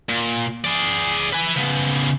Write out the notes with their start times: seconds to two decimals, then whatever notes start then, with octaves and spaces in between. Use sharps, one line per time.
0.09 A#2
0.65 G#4 D5
1.33 B4 G#5
1.57 C#3 B3